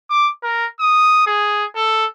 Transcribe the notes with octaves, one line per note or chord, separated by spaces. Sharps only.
D6
A#4
D#6
G#4
A4